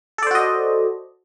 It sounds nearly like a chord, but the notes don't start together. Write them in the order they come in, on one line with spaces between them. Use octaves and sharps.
A4 D5 C5 F#4 D#5